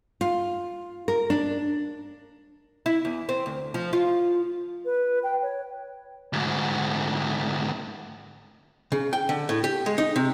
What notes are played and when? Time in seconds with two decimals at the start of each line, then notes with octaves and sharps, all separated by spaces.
0.21 F4
1.08 A#4
1.30 D4
2.86 E4
3.05 E2
3.29 C4
3.46 D2
3.74 F3
3.93 F4
4.85 B4
5.24 G5
5.42 C#5
6.33 D2 G#2
8.92 C#3
9.13 G5
9.29 D3
9.49 A2
9.64 G4
9.86 G#3
9.98 D#4
10.16 C3